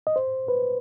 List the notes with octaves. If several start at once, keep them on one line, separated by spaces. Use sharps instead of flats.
D#5
C5
B4